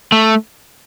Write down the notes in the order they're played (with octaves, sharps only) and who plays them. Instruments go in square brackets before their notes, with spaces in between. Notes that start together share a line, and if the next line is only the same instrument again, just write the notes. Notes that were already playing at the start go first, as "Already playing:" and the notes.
[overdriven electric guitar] A3